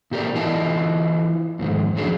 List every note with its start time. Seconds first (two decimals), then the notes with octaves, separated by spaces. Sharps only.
0.11 A#2 G4 A#4 D5
0.35 E3 E4 F4 D#5 G#5 A5
1.59 F2 G#2 D#3
1.96 F3 F#3 C#4 D4 F4 G#4